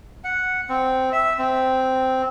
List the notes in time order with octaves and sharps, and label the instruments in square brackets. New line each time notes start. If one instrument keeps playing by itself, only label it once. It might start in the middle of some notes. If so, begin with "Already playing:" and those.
[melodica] F#5
C4
E5
C4